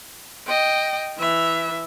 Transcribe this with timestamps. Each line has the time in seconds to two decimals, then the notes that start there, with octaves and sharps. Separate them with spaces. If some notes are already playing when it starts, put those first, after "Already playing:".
0.47 D#5 G5
1.19 E3 E5